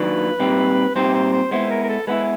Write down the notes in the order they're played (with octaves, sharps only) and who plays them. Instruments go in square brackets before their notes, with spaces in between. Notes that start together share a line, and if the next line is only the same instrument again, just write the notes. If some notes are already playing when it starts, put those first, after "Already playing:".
Already playing: [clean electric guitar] D#3 F#3 A#3 D4 F4 [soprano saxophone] B4
[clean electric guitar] A#2 G3 C4 D#4 G4
[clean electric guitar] A#2 G3 C4 D#4 G4 [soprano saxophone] C5
[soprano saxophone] C5
C5
[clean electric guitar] G#3 B3 E4 [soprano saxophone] C5
[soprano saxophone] A#4
A#4
A4
[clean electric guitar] G#3 B3 E4 [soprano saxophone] B4